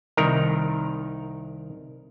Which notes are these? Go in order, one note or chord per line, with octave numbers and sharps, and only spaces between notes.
C2 D#3 A#4